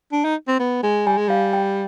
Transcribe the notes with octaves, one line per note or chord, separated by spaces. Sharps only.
D4
D#4
C4
B3
G#3
G3 G#5
G#3
G3 F5
G5